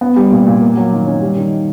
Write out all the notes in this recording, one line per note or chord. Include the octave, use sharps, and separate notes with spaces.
B3
G3
A#2
A#2
A#3
F#3
D#3
C#4
G3
D#3